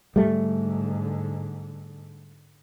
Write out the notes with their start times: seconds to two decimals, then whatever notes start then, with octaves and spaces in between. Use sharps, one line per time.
0.16 G#2 D3 G3 A3